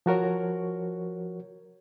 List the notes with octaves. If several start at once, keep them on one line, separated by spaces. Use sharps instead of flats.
F3 F#4 A#4 C#5